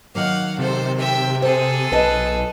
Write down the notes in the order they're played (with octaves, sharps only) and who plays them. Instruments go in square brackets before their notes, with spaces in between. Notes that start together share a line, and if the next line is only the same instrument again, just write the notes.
[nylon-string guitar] D#3 F#3 A#3 [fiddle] F5 F#5
[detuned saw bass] C3 [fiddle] A4 C5
[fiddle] E5 G5
[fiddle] G#4 A4 [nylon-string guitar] C5
[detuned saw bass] B1 [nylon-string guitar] B4 D#5 A5